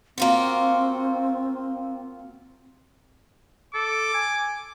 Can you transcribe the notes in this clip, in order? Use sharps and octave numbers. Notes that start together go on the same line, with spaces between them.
A#3 C4 F4 F#4
A4 D6
G#5